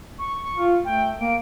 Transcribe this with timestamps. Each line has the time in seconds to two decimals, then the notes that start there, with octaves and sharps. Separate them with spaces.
0.18 C#6
0.56 F4
0.84 A3 G5
1.20 A#3 D7